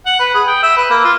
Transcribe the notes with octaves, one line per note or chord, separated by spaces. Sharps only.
F#5
B4
G#4
G5
E5
B4
A#3
F4